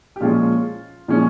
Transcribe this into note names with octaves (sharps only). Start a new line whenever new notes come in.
G4
A#2 F3 G#3 C#4 F4
A#2 F3 G#3 C#4